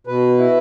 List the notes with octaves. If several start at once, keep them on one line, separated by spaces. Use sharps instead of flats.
B2 B4
E4